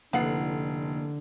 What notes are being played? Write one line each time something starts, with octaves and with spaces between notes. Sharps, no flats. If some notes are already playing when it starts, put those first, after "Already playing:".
F1 D3 A#3 B3 E4 A4 F#5 C7